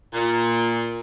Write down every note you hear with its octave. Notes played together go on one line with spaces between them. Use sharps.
A#2